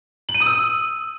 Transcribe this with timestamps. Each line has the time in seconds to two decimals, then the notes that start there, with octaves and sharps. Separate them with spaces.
0.29 F#7
0.34 D#7
0.40 D#6
0.46 E6